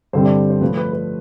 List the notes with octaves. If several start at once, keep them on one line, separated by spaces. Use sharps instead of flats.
G2 D3 G3 C4 C5
D5
C5
A2 F3 A3 B4
B4
B4